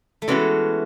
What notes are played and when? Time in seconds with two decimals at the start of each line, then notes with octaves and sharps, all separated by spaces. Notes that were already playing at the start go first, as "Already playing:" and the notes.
0.22 A3
0.28 E3 G#3 B3 C#4 F#4 A4